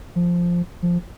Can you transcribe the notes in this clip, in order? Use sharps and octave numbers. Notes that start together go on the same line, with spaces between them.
F3
F3